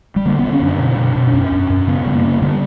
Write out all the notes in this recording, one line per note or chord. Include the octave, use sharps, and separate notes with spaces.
G3
D3 A#3
D3 B3
C#4
F#2 D4
B2
B2
B2
D4
F#2 C#4
F#2
F#2
C#3 B3
C#3 G3
A#3
C#3
D3 G3